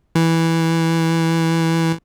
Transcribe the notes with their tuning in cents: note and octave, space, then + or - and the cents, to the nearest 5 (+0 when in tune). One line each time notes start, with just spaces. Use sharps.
E3 -5